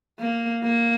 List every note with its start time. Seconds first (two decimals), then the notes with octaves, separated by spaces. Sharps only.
0.20 A#3
0.63 A#3